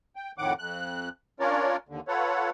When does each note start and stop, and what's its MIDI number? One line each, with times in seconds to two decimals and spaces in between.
0.16 0.32 79
0.38 0.53 41
0.38 0.53 45
0.38 0.53 51
0.38 0.53 78
0.38 0.53 86
0.59 1.09 41
0.59 1.09 90
1.40 1.76 61
1.40 1.76 62
1.40 1.76 65
1.40 1.76 70
1.40 1.76 73
1.40 1.76 74
1.89 2.00 39
1.89 2.00 50
2.08 2.50 65
2.08 2.50 69
2.08 2.50 71
2.08 2.50 73
2.08 2.50 78